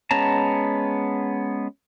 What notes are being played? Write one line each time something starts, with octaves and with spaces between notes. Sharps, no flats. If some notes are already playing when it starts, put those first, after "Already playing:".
G#3 B3 C#4 A5 A#5